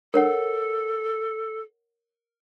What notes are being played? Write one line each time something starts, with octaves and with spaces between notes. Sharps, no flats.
A4 A#4 C#5 F#5